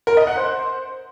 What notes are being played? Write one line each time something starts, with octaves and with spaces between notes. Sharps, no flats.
A#4
D#5
F#5
C5